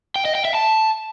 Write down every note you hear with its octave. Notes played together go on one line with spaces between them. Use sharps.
G5
D#5
G5
E5
A5